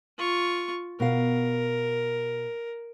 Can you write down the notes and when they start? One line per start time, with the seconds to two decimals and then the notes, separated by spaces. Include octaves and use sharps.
0.18 F4 C#6
1.00 B2 A#4 F5